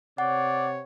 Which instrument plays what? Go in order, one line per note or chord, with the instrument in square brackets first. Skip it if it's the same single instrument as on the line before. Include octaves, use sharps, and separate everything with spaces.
[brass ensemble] C3 C#5 [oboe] D5 [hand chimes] F#5